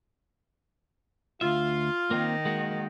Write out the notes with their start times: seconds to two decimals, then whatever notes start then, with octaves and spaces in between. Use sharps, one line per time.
1.41 D2 G#2 F4 E5
2.11 D#3 A#3 C4
2.45 G#3 A#3 F#4